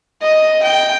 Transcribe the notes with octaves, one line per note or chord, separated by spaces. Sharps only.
D#5
G5